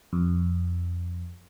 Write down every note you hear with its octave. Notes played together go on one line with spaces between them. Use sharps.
F2